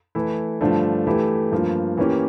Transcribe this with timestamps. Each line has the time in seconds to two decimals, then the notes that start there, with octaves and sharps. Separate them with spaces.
0.15 E3 A3 E4
0.61 G2 D3 F3 A3 D4
1.07 E3 A3 E4 G4
1.52 G2 F3 A#3
1.97 E3 A#3 C#4 G4